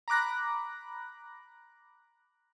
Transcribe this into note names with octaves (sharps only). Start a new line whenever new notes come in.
A#5 B5 D6 F#6 A#6